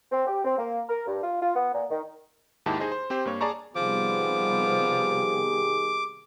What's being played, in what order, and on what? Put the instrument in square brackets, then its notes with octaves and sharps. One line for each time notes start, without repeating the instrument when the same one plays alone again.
[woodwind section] C4
G4
C4
A#3
A#4
G2
F4
F4
B3
A#2
D#3
[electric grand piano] D#2 G#2 D#3 E4 G4 A5
D#4 G#4 C5 D#5
C5
C4 G4 C5
G2 A#3 C#5
G#4 D5 A5 A#5 C#6
[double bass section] C3 G3 B3 [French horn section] D#3 G4 G#4 [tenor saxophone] F3 [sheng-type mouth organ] D6